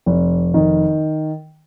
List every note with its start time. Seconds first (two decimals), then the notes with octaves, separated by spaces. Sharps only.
0.06 F1
0.54 D#3